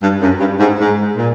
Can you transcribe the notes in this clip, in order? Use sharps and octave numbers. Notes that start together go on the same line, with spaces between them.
G2
F#2
G2
G#2
G#2
A#2